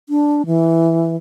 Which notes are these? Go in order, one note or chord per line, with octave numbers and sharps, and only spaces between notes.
D4
E3